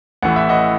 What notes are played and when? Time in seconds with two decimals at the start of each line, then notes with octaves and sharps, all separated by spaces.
0.22 A1 A2 E3 F#5
0.36 E5
0.49 D#5 F#5